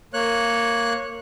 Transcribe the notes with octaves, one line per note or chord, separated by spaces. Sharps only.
A#3 C#5 F#6